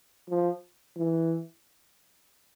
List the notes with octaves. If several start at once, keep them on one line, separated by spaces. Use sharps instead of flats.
F3
E3